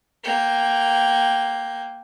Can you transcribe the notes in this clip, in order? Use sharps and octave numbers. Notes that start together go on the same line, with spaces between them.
A#3 G5